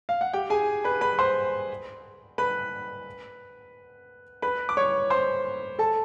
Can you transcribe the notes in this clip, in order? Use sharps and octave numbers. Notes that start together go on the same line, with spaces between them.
F5
F#5
G4 G5
G#4 G#5
B4 B5
B4 B5
C5 C6
B4 B5
B4 B5
D6
C#5 C#6
C5 C6
A4 A5